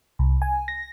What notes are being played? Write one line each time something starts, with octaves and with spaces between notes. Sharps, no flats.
C2
G#5
A#6